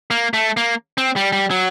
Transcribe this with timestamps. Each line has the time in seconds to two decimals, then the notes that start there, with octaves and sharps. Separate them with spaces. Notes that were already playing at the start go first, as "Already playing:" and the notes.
0.11 A#3
0.34 A3
0.57 A#3
0.98 C4
1.16 G3
1.33 G3
1.50 F#3